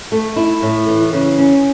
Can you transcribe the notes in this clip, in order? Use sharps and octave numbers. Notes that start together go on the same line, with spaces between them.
A3
E4
A2
E3
C#3
C#4